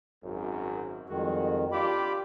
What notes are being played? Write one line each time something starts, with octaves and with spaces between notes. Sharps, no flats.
G#1 F#2
F2 D#3 G3 G#3 F#4
D4 F4 G4 B5 D6